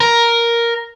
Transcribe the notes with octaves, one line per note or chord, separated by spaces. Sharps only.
A#4